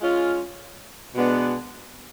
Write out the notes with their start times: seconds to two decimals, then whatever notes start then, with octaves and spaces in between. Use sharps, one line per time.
0.01 G#3 C#4 F4
1.15 B2 G#3 B3 D4